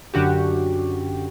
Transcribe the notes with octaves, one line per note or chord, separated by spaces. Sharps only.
F#2 D3 F#4 G4